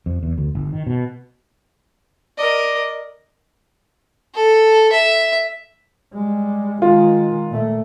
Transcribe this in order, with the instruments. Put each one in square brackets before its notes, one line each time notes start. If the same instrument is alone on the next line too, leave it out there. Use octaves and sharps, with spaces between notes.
[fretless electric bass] F2
E2
D2
G1
D#3
B2
[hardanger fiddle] A#4 D#5 [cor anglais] D5
[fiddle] A4
E5
[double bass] G3 G#3
[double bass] D#3 G#3 [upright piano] F4
[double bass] A#2 A3